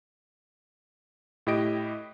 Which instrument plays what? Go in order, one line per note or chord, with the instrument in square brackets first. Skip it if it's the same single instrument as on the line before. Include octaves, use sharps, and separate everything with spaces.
[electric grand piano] A2 E4 G4 D#5 D7